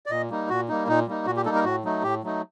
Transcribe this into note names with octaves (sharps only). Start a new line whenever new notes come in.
D5
A#2 D#5
G3 A#3 D#4
A#2 F#4
G3 A#3 D#4
A#2 D#4
G3 A#3 D#4
A#2 F#4
G4
G3 A#3 D#4 A4
A#4
A2 F#4
F#3 A3 D#4
A2 G4
F#3 A3 D#4